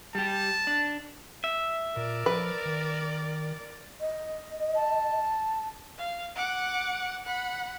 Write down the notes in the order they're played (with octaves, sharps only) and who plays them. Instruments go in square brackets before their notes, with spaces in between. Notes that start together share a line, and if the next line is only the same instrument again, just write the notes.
[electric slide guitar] G3 G4 [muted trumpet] A5
[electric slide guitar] D4
[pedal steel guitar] E5
[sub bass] A#2 [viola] A#4 D5
[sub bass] F3 [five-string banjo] B4
[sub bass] D#3
[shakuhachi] D#5
[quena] A5
[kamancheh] F5
F#5 D6
F#5 B5